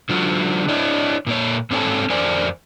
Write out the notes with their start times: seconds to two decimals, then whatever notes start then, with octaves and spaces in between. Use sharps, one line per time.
0.09 D3 F#3 F4 F#4
0.69 D4 E4 C#5 D#5
1.27 A#2 A#3 C#5
1.71 G#2 C4 A4 C#5 G#5 A5
2.10 F2 A#4 C5 D5 G#5